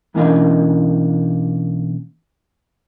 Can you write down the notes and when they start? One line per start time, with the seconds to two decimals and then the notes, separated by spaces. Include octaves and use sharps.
0.14 B1 E3 A#3 C#4 D4 D#5